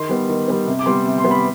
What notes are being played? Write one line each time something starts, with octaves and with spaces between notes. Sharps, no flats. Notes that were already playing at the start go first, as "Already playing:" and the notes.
Already playing: D#3 C6
G3 B3
D#3
G3 B3
C3
D6
G3 B3 C6
C3
C6
G3 B3
B5